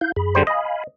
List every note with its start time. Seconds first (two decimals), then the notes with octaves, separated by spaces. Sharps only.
0.01 E4 F5 G6
0.16 F#2 G#4 B5
0.35 D3 G3 C5
0.47 D#5 F5 G#5 B5